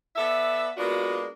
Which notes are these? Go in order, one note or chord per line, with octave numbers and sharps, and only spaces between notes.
B3 A4 D5 E5
G#3 A#3 B3 D4 F4 F#4